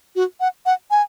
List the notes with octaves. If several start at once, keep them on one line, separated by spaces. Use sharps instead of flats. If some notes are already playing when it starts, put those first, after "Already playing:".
F#4
F#5
F#5
G#5